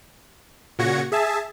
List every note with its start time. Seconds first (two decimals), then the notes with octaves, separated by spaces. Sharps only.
0.79 A#2 C#3 F#4 G#6 A#6 C#7
1.12 G#4 E5 A5